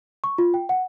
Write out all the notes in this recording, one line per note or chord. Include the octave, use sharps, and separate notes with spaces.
C#6
F4
G5
F#5